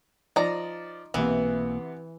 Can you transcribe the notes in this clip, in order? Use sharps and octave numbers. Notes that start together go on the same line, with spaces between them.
F3 D#4 D5 A#5
B1 C3 E3 A#3 B3